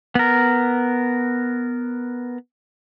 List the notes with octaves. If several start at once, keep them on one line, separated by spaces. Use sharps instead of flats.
B3 A#4